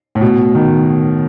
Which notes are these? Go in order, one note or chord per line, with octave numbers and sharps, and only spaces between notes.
A2
B2
D#3